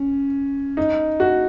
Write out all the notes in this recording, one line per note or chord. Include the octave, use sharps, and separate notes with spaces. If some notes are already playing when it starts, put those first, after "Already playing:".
Already playing: C#4
D#4
F#4